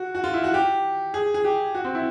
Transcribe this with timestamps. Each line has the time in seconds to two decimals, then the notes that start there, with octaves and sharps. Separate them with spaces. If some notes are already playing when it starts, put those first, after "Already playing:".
Already playing: F#4
0.15 F#4
0.24 F4
0.34 E4
0.44 F#4
0.54 G4
1.14 G#4
1.34 G#4
1.44 G4
1.75 F#4
1.84 C4
1.95 E4